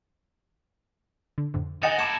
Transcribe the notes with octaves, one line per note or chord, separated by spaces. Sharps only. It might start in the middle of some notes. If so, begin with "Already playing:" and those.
D3
F2 A2 D3
D#3 D#5 F#5 G#5 A6 A#6 C#7
A#3 E4 A5 D6 G#6 C#7 E7